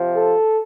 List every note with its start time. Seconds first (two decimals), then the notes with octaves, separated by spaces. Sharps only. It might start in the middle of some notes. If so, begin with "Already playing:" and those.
Already playing: C3 F3
0.15 A4